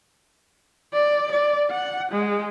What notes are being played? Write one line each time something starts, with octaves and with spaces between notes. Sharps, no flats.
D5
D5
F#5
G#3